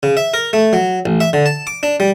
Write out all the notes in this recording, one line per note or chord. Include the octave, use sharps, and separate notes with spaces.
C#3
E5
A#4
A3
F#3
A1
E5
D3
A5
D6
D4
G3